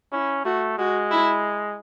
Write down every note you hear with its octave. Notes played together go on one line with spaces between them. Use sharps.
C#4 E4
A3 F#4
G#3 F#4
E4